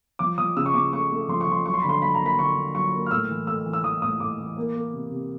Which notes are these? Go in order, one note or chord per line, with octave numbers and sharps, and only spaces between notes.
F3 D6
F3 D#6
C#3 E6
C#6
C#3 D6
A3 C#6
A3
F3 C6
C#6
F3 C6
F#3 C#6
C6
D3 B5
C6
F#3 B5
A#5
A#3
B5
D3 C#6
D3
F#3 C#6
A#3
F6
A2 E6
E3
A3 E6
E3
E6
E3 D#6
A2 D#6
A2 D6
E3
A#3
A#3
C3
C3